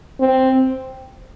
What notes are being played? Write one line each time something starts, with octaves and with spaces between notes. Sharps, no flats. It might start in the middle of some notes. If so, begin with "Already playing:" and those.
C4